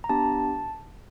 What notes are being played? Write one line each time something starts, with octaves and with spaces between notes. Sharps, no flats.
A#5
B3 D4 G4 A5